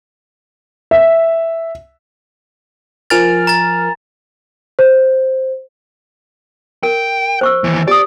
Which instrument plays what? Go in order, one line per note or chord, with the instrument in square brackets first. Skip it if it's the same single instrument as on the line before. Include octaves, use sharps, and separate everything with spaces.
[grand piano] E5
[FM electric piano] F3 A#4 F6 [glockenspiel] G#5 A6
[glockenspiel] A#5 A6
[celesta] C5
[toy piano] A#4 [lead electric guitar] G5
[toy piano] C5 C#6 E6
[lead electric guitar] D#2 E3
[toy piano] G4 D#6 [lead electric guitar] D5